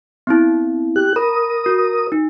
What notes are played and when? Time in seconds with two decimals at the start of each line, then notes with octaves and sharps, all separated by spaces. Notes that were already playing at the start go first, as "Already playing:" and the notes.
0.27 B3 C4 E4
0.96 G4 F#6
1.16 A#4 B5 D#6
1.66 F#4
2.12 D#4